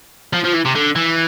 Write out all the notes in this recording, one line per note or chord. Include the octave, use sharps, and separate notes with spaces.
F3
F3
E3
C3
D3
E3